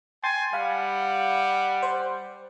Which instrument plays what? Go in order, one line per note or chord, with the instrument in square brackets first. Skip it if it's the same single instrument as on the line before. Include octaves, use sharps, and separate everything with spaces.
[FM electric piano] G5 C6 A6 [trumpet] G#5
[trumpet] G3 [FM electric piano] F5 B5 [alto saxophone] F#5
[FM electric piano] C5